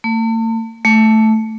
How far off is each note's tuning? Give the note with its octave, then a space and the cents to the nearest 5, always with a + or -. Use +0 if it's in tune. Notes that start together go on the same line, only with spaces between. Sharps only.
A3 +40
A3 -5